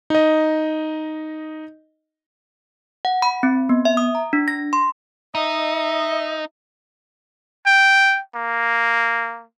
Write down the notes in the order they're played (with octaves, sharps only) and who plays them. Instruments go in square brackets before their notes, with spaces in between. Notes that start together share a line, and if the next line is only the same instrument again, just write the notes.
[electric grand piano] D#4 D#5
[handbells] F#5
B5
C4
B3
E5
D#6
A#5
D4
A#6
C6
[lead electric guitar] D#4 [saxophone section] D#5 E5
[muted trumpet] G5
A#3